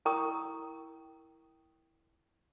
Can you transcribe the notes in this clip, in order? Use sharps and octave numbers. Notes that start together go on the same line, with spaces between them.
E4 A#4 G5 A#5 C#6 D#6